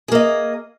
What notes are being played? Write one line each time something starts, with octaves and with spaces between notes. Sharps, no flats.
A#3 G#4 D#5